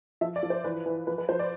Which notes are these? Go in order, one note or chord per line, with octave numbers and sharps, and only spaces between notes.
F3 E5
D5
F3
C5
E3 B4
E3
F3 B4
B4
F3 C5
D5